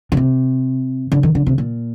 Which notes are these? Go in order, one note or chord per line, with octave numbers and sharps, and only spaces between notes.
D3
C3
D3
D#3
D3
C3
A#2